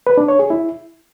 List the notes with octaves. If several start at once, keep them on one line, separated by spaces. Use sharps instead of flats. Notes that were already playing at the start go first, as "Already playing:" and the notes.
B4
D4
C#5
G#4
E4